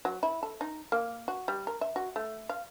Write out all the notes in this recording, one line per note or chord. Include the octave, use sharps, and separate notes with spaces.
F#3
E4
A4
D#4
A#3
F#4
G3
A#4
E5
F#4
A3
F5